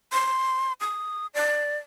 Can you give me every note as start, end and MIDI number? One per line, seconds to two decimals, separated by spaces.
0.13 0.73 84
0.81 1.27 87
1.34 1.77 74